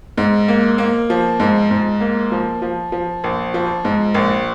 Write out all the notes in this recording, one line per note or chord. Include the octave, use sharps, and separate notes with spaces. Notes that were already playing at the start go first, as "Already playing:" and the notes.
G#2
A#3
A#3
F3
G#2
G#2
A#3
F3
F3
F3
A#1
F3
G#2
A#1